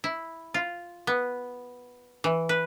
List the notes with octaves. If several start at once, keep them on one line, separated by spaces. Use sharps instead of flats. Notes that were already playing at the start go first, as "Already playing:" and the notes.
E4
F4
B3
E3
B4